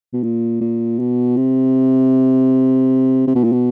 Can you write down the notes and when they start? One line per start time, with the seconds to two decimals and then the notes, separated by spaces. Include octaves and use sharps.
0.13 B2
0.23 A#2
0.61 A#2
0.99 B2
1.37 C3
3.27 C3
3.35 B2
3.44 A#2
3.52 B2